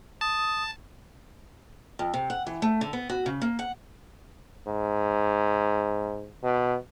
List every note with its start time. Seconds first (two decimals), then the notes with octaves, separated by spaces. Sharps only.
0.21 A5 D#6
1.99 F2
2.14 C3
2.30 F#5
2.47 E3
2.62 A3
2.81 D3
2.93 B3
3.10 F#4
3.26 C#3
3.42 A#3
3.59 F#5
4.67 G#2
6.43 B2